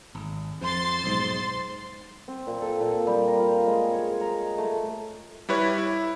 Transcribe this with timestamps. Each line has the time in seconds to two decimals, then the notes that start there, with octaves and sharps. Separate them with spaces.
0.15 G#1
0.61 F2 C5 C6 A6
1.04 B1 G#2
2.28 C4
2.47 A#2
2.62 A4
2.81 A#2
3.07 G3
3.28 A#5
3.39 F4
3.67 G#3
3.91 C#5
4.21 A#5
4.58 A3
5.49 G3 E4 B4 C#5
5.78 E4